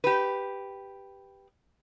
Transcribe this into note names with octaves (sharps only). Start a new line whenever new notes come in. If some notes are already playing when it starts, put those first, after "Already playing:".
G4 B4